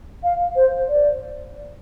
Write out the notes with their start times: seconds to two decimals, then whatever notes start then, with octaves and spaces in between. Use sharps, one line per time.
0.24 F5
0.56 C5
0.88 D5